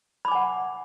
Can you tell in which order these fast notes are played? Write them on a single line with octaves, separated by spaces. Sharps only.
B5 D6 G#5 F#5